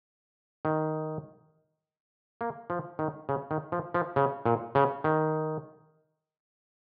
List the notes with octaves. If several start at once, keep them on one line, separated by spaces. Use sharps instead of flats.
D#3
A#3
F3
D#3
C#3
D#3
F3
F3
C#3
A#2
C#3
D#3